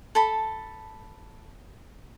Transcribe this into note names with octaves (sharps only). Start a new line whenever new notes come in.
A4 A5 B5